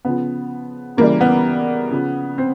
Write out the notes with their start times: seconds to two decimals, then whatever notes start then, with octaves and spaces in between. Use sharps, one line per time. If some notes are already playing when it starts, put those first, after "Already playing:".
0.05 C#3 F3 B3
0.97 C#3 E3 G3 A#3
1.21 B3
1.91 C#3 F3
2.38 C4